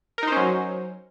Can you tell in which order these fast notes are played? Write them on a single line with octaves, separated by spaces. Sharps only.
A#4 D#4 C5 C#4 F#3